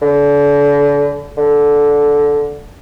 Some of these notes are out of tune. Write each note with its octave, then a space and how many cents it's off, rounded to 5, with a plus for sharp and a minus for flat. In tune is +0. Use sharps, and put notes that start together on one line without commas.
D3 -35
D3 -10